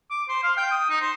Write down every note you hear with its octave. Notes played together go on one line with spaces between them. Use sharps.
D6
C5
F5
G5
D#6
D#4
C5